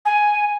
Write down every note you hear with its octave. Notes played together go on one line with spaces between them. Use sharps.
G#5